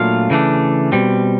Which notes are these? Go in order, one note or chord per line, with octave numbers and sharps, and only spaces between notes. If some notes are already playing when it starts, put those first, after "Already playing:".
Already playing: A#2 F#3 A3 D4 F4 F5
C#3 E3 A3 D4
B2 G3 C4